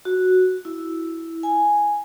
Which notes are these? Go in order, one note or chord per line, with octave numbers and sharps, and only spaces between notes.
F#4
E4
G#5